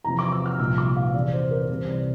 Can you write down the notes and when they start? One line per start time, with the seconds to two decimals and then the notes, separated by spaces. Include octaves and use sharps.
0.04 E2 C3 F3 A#5
0.19 D6
0.32 E6
0.46 F6
0.59 C2 A#2 F3 E6
0.78 D6
0.96 F5
1.14 E2 C3 E3 D5
1.32 C5
1.51 A#4
1.69 C2 C3 E3 C5
1.88 D5